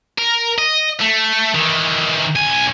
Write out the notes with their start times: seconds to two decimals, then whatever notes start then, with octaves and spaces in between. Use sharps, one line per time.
0.18 A#4
0.58 D#5
1.01 A3
1.55 D#3 E3
2.36 B1 G#5